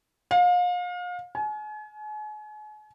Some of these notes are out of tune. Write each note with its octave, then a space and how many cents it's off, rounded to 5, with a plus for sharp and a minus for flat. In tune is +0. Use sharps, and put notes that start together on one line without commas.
F5 +35
G#5 +40